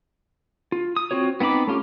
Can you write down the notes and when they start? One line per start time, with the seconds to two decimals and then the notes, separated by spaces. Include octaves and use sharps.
0.72 F4
0.97 D#6
1.11 C4 F4 F#4 C#5
1.40 B3 C4 D#4 B5 D6
1.67 A3 C#4 F4 G4